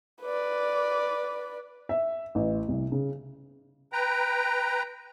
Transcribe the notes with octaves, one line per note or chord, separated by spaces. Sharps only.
B4 D5
E5
A1
C2
C#3
B4 G5 A#5